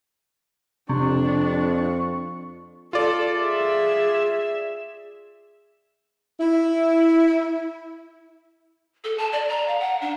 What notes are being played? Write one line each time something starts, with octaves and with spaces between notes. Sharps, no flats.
F2 C3 D4 C#6
F4 A4 D5
G#4 E5
E4
A4
A5
D5
A#5
F5
F#5
D4